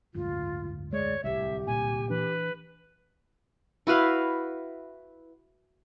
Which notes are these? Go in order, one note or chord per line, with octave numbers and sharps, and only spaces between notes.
F#1 D2 G#2 F4
G#3 C#5 D5
D1 G1 C2 G4 E5
A#2 G#5
E3 D4 B4
E4 F#4 B4 F5